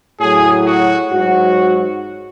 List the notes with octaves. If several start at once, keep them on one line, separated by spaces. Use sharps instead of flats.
A2 F#3 G#4
F#4
G#2 F#3 F#4